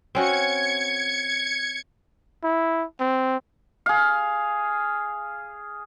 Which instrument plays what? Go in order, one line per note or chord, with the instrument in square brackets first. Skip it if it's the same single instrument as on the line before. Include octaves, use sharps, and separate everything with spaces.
[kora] C4 C#4 F#4 [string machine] G#6 C#7
[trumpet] E4
C4
[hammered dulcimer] G#4 F5